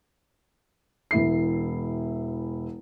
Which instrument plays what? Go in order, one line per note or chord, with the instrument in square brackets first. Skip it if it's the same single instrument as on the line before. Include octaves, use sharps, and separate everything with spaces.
[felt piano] E1 E3 E4 C7